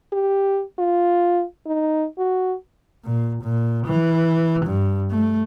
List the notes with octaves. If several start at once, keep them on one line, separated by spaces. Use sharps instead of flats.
G4
F4
D#4
F#4
A#2
A#2
E3
G2
A3